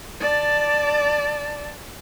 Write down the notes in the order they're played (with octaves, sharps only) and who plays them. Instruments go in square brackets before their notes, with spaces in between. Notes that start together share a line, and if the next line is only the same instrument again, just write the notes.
[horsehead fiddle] D5 A5